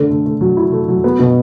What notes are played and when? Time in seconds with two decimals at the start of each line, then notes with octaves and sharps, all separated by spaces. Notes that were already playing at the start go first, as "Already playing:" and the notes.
Already playing: D3 A3
0.11 A3
0.26 A3
0.41 F#3
0.57 E4
0.72 A3
0.88 F#3
1.04 B3
1.19 B2